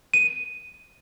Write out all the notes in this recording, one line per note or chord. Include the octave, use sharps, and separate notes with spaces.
D#7